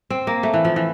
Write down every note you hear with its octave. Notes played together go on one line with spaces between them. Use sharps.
C4
A#3
A3
E3
F3
E3